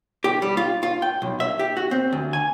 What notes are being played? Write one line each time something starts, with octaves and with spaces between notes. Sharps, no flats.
G4
G3
F4
F4
G5
B1
E5
G4
F#4
C4
D2
G#5